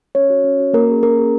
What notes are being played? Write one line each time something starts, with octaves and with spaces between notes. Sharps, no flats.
C#4 C#5
F#4
C#4
F#4
A#3 A#4
C#4 G#4
A#3 A#4
C#4 G#4